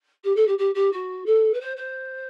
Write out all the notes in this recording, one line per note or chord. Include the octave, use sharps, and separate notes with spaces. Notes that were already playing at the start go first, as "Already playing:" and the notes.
G4
A4
G4
G4
G4
F#4
A4
B4
C5
C5